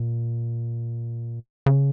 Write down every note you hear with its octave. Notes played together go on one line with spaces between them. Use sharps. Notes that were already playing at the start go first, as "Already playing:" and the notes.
Already playing: A#2
C#3